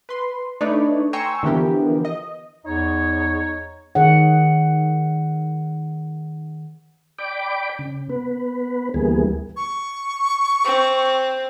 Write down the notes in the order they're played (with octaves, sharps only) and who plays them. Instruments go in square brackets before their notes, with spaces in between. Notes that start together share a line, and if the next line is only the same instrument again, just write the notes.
[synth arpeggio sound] B4 C6
A3 D4 D#4 B4 C#5 D5
G5 G#5 A#5 C6 C#6 E6
D3 E3 F3 B3 G4 A#4
D#5
[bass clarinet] E2 [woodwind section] D#4 C#5
[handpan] D#3 G#4 C#5 F#5
[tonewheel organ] D5 G5 B5 D6
C#3
B3 B4
D2 E3 G3 A#3 B3 G#4
[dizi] C#6
[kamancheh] C4